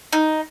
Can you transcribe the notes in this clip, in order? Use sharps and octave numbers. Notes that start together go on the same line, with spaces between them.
D#4